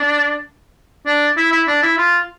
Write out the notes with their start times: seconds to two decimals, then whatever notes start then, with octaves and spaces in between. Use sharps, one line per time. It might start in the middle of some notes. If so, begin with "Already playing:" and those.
Already playing: D4
1.06 D4
1.37 E4
1.52 E4
1.68 D4
1.83 E4
1.98 F4